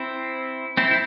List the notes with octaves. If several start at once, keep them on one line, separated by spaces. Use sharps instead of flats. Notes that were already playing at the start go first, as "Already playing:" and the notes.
Already playing: C4 E4
C4 E4
E4